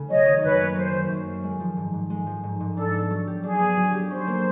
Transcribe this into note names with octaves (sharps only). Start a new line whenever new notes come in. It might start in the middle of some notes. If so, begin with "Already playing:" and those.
Already playing: C#3 A3
F#3 C#5 D#5
D#3
F#2 B4 C#5
A#3
F#3 C5
D#3
F#2
A#3
G#3
F3
G#2
G#2
G#3
F3
G#2
G#2
D4 A4
B3
F#3
G4
D4 G#4
B3
F#3
G4
C#4 C5
A#3